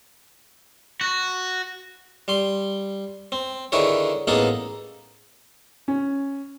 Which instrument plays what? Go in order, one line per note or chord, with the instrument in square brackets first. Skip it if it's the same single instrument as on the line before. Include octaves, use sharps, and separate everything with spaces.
[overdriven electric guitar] F#4
[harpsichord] G3 C6
C4
D3 D#3 E4 G#4 B4 C#5
A1 A#3 B3 D#4 G#4 A4
[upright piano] C#4